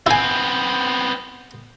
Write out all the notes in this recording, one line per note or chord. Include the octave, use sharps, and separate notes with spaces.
B3 C4 E4 G#5